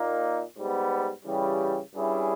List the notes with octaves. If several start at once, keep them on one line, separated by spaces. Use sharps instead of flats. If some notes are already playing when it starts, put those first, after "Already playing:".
Already playing: A#2 A#3 D#4
G#2 G3 B3
C#3 E3 G3
G2 G3 C#4 E4 G#4